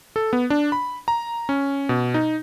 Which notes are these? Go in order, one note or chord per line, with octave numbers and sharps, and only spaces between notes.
A4
B3
D4
B5
A#5
C#4
B2
D#4